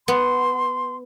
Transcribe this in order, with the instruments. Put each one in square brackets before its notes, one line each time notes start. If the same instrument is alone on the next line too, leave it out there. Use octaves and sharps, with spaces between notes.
[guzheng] B3 [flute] C6